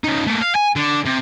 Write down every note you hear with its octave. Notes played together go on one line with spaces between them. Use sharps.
C#3 D#4
A3 A#3
F5
G#5
D3
C3